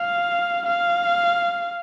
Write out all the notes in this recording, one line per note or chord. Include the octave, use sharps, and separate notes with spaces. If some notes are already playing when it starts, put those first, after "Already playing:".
Already playing: F5
F5